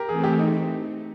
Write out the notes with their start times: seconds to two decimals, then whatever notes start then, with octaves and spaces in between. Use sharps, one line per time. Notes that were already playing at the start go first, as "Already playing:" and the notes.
Already playing: G4 A#4
0.09 E3 A3 C4 G#4
0.24 G4
0.39 D#4